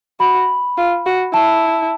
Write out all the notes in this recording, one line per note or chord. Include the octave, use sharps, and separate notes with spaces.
F#4 B5
F4
F#4
E4 A5